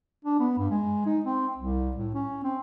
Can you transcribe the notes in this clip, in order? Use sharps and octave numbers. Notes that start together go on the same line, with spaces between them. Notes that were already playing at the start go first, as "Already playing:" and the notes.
D4
B3
G2
G#3
D#4
C4
C2
A2
C#4
C4